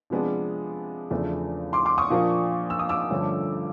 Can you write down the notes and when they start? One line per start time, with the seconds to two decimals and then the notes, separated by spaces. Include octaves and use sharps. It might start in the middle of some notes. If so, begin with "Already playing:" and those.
0.10 C3 F3 G#3 B3 D4
1.10 E2 C#3 F3 A3 D4
1.73 C6 D6
1.85 C6 D6
1.98 C#6 D#6
2.10 A#2 F3 A#3 D4
2.70 E6
2.79 D#6
2.89 D6 E6
3.10 G2 D3 F3 A3 C#4